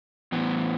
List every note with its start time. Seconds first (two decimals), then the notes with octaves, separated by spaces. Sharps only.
0.32 A2 E3 B3